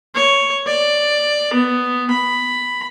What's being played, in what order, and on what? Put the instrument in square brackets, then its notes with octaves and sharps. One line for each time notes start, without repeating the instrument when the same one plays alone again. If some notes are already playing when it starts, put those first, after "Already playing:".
[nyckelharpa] C#5
D5
B3
B5